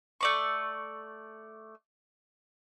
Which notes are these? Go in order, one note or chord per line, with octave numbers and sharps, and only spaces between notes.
A3 D5 C#6